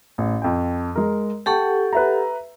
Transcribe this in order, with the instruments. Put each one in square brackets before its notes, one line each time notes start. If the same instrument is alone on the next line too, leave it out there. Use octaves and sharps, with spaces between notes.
[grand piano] A1
F2 G5
G#3 A#4
[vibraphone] G4 A4 F#5 [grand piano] G5 A5 C#6
[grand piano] B4 E5 A#5